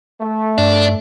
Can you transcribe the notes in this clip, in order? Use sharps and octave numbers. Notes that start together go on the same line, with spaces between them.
A3
G2 D4